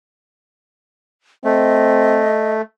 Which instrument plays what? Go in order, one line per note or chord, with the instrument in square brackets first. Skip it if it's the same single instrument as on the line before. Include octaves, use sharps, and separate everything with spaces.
[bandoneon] A3 [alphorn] C4 [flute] D#5